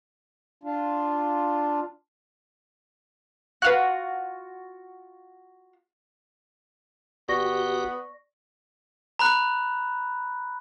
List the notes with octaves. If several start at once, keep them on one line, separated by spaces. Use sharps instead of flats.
D4 F4
F4 F#4 B4 F5 F#6
G1 B3 F#4 G4 D5 C#6 A#6
A#5 B5 F#6